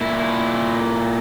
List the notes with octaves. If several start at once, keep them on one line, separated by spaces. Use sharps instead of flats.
A#2 E4